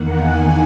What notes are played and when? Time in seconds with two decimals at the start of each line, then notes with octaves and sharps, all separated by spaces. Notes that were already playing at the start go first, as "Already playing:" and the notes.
Already playing: E2 D#3 A#3 F#5
0.18 G#5